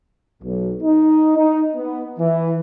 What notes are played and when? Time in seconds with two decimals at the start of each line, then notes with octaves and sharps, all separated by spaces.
0.43 B1
0.82 D#4
1.38 D#4
1.75 B3
2.19 E3